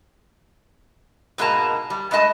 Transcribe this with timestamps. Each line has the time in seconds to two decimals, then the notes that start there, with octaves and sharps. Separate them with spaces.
1.38 G#2 B2 G#3 A#3 A5 A#5
1.90 G3
2.11 G2 G#3 A3 D#5 A5